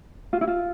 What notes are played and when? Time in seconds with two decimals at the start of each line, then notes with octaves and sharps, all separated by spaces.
0.33 F4
0.41 E4
0.47 F4